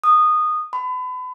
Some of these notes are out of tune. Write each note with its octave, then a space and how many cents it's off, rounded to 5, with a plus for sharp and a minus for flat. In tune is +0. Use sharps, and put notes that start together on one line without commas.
D#6 -15
B5 +35